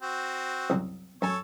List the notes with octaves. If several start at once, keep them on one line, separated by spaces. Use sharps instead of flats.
C4 F#4
C2 F#2
F#2 A4 C#5 G#5